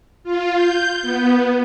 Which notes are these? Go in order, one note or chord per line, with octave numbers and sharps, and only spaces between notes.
F4
G6
B3